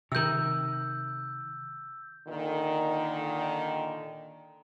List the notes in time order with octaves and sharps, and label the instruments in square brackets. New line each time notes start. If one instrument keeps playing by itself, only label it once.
[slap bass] C3 D#3 [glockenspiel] E6 G6
[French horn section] A#2 D3 D#3